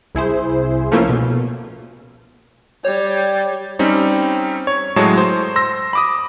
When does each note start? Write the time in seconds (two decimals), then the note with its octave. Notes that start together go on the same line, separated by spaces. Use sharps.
0.15 C2 E4 G#4 C5
0.92 F3 A3 A#3 C#4 E4 F4
1.09 B2
2.85 G3 C#5
3.79 G3 C4 C#4 D#4
4.67 C#5
4.96 A2 F#3 G#3 C#5 A5
5.17 C5
5.56 C6 E6 A#6
5.93 B5 D6 D#6